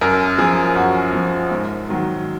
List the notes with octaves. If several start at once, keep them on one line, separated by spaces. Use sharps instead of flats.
F#2 A#4
F3 G#4
F#2 F#4
F3
G#2
D#3 F#3